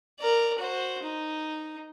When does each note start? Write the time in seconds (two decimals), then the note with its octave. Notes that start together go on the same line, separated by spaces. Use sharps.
0.20 A#4 D5
0.59 F#4 C5
1.03 D#4